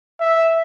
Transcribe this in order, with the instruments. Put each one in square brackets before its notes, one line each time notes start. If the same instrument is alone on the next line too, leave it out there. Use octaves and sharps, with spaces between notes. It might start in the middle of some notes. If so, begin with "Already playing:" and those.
[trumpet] E5